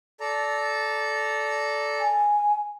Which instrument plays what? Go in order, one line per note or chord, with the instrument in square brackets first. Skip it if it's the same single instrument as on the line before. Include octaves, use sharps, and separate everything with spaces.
[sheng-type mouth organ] A4 D5 A#5
[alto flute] G#5